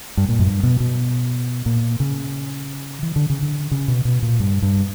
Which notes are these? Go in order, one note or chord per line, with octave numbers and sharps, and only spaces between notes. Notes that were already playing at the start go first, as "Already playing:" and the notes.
G2
A#2
F#2
G2
B2
B2
A#2
C#3
E3
D3
C#3
D3
C#3
B2
B2
A#2
G2
G2